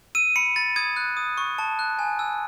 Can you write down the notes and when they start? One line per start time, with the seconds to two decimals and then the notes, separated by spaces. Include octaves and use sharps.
0.15 E6 D#7
0.36 B5 C#7
0.56 B5 A6
0.76 D#6 G#6
0.96 F#6
1.17 D#6
1.38 C#6
1.58 A5
1.79 F#6
1.99 G#5
2.19 E6